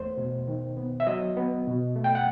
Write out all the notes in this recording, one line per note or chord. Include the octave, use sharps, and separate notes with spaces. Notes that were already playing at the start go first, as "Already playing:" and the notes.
Already playing: E2 A3 C5
B2
D#3
B3
E5
F#3 D#5
B3
B2
A3
G5
F#5